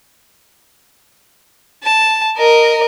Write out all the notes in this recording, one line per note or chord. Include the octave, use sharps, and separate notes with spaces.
A5
A#4 D#5